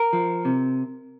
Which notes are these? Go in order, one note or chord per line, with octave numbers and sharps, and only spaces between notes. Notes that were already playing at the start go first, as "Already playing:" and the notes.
Already playing: A#4
F3
C3